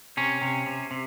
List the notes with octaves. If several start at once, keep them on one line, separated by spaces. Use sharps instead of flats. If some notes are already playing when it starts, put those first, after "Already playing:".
C3 C#4
C3
C3
C3